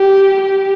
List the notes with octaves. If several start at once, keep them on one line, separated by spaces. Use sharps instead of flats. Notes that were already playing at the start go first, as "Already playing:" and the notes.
Already playing: G4
G4